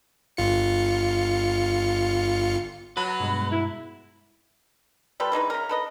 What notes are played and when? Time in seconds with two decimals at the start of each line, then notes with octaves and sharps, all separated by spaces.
0.37 G1 F4 C#7
2.97 F#3 B4 A6
3.20 G2 B2 G#3
3.52 E4
5.20 G3 F4 A4 B4
5.32 E3 G#3 D#4 B4
5.50 C#3 A#4
5.69 A4 B4 D#5